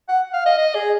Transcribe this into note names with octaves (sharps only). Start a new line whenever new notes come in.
F#5
F5
D#5
D#5
G#4